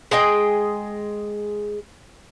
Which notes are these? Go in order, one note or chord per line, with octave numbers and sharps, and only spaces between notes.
G#3 G#4 D#5 G5